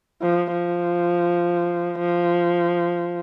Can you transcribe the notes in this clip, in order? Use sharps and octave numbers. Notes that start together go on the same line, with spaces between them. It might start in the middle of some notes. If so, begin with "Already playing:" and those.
F3
F3
F3